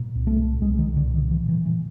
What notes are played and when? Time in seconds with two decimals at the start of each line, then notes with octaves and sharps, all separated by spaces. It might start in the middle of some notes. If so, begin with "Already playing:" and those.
Already playing: A#2
0.15 C2
0.27 A3
0.38 A#2
0.61 C2 G#3
0.79 D#3
0.85 C2
0.97 D3
1.08 A#2
1.14 D#3
1.30 A#2 E3
1.49 E3
1.54 A#2
1.66 E3